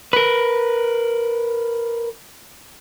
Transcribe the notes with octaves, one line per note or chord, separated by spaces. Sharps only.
A#4 B4